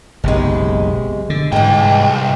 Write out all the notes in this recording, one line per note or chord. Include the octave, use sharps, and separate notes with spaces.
F#1 B1 C3 G#3
D3
C2 G#2 E3 G#3 G5